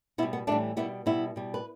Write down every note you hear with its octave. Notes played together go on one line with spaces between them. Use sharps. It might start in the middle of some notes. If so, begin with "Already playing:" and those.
B2 G3 B3 E4
B3
A2 E3 G3 A3 D4
B2 G3 B3 E4
B2 G3 B3 E4
B2 G3
B4